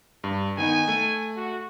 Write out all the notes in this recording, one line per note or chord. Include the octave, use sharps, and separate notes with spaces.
G2
D#3 B3 D#4 G#5
A3
F#4